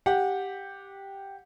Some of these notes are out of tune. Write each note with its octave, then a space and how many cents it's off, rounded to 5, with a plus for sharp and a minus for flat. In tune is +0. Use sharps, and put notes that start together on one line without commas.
G4 +0 F#5 -15